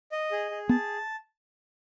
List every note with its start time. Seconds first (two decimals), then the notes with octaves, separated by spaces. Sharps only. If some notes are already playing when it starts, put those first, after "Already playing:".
0.12 D#5
0.31 G#4
0.51 G#4
0.69 B3 A5